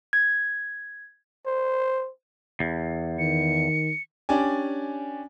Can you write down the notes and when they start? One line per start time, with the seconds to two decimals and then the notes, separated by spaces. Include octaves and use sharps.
0.13 G#6
1.46 C5
2.60 E2
3.19 D#3 C#7
4.29 C#4 D4 G4 D5 G#5